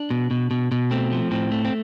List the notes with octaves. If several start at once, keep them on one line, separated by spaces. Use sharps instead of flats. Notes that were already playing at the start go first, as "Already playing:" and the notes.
Already playing: D4
B2
B2
B2
B2
A3 C4
F3
A2 C4
A3
C4